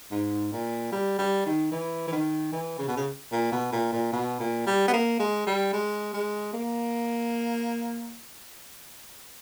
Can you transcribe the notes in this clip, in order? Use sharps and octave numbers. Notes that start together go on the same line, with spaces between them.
G#2
A#2
G3
G3
D#3
E3
E3
D#3
E3
C#3
B2
C#3
A#2
B2
A#2
A#2
B2
A#2
G3
B3
A#3
G#3
G3
G#3
G#3
A#3